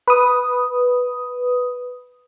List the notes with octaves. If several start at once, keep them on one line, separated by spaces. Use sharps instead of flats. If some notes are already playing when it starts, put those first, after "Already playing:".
B4 D#6